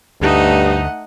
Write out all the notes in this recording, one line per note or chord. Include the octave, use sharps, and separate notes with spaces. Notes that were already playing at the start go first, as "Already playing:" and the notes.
D2 G2 A3 D#4 D#5 F#5